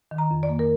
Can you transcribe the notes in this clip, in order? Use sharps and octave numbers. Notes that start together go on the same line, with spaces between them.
D#3
A#5
F2
D5
A#3
A#4